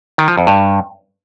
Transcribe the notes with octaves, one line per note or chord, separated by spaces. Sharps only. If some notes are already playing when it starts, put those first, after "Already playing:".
D#3
F3
F2
G2